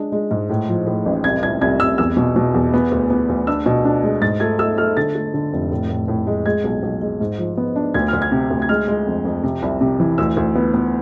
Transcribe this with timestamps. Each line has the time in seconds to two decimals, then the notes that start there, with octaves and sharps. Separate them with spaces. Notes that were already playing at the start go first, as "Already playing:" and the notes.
Already playing: G#3 D4
0.12 G#3
0.31 G#2
0.50 A2
0.68 F3
0.87 A2
1.06 A1
1.24 C2 G#6
1.43 C2 G#6
1.61 C2 G#6
1.80 C2 E6
1.98 E2 E6
2.17 B2
2.36 B2
2.54 E2
2.74 B3
2.91 D2
3.10 B3
3.29 D2
3.47 D4 E6
3.66 B2
3.85 D4
4.03 G#3
4.21 G#2 A6
4.40 A3 G#6
4.59 A3 E6
4.78 A3 F6
4.97 D3 A6
5.15 A3
5.34 D3
5.53 F1
5.71 A2
5.90 A2
6.08 A2
6.27 G#3
6.46 G#3 G#6
6.64 B1
6.83 B1
7.02 G#3
7.21 G#2
7.38 F3
7.57 B3
7.76 D4
7.94 D2 G#6
8.08 D2 F6
8.22 G#6
8.32 C3
8.50 D2
8.62 G#6
8.69 G#3 F6
8.88 G#3
9.07 F2
9.25 F2
9.44 C3
9.62 C2
9.81 C3
10.00 E3
10.18 D2 E6
10.37 D2
10.55 B3
10.74 B3